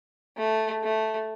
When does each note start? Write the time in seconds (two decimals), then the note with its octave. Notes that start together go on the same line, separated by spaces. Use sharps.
0.37 A3
0.84 A3